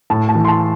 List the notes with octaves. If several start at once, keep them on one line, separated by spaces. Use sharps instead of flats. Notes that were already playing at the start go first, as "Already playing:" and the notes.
A2 A5
A5
E3
C6
A5